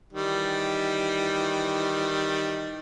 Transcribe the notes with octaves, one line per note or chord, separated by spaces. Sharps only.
D#3 E3 G3